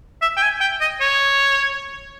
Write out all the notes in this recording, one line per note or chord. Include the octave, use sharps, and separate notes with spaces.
E5
G5
G#5
G5
D#5
C#5